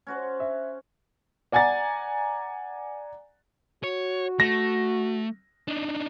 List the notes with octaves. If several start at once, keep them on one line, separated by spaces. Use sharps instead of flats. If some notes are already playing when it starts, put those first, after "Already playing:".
C#4 F#4 C5
E5
D5 F#5 G#5 A#5 A6
F#4 C#5
A3 A#6
D4 D#4